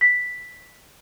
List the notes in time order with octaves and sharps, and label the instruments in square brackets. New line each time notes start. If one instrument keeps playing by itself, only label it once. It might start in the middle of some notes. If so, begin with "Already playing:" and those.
[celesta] B6